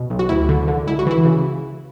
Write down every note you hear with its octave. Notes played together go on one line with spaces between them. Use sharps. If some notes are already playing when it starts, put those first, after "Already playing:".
Already playing: B2
B1
F#4
D2 E4
D3
D3
C#2 E4
F#4
E3 E4
C#3